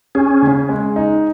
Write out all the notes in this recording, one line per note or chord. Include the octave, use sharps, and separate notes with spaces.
C#4 G#4
C#3
G#3
D#4